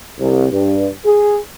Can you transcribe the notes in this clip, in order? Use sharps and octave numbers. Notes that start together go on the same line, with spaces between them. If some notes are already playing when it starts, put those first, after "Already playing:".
C2
G2
G#4